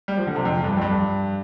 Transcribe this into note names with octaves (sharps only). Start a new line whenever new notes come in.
G3
F3
D3
C3
F2
G2
F2
G2